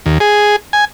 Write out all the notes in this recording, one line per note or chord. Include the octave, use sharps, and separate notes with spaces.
D#2
G#4
G#5